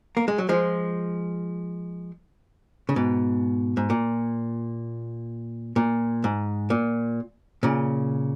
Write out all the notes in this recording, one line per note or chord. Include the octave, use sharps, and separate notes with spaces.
A#3
G#3
F#3
F3 G#3
C#3
G#2 B2
G#2
A#2
A#2
G#2
A#2
A#2 C#3